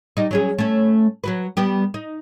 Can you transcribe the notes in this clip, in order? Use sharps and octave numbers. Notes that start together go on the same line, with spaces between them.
G3 D#4
F#3 C#4 G#4
A3 C#4
F#3 F#4 B4
G3 B3 G4
D#4